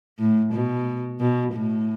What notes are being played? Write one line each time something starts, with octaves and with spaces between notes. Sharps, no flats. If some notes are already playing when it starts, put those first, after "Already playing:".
A2
B2
B2
A2